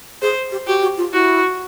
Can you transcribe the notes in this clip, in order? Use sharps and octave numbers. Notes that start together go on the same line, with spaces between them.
G#4 C5
G4
F#4 G4
F#4
F4
E4 F#4